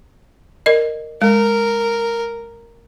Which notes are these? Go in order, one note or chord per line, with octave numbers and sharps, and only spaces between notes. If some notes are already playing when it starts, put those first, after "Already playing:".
A#4 D5 D#5
G#3 A#4